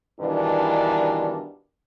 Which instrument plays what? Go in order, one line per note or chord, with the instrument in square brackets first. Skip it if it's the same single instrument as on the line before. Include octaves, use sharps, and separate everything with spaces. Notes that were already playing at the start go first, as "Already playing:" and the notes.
[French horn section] G2 B2 D#3 E3 D4